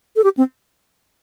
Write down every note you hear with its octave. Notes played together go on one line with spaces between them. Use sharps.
A4
G4
C4